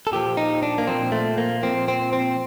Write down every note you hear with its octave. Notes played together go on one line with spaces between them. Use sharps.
A4
A#2 F3 G4
D#4
D4
A#3
A#2 F3 C4
A3
A#3
A#2 F3 C4
C4
C4